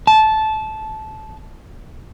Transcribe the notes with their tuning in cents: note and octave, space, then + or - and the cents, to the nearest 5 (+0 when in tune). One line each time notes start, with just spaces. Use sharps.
A5 -15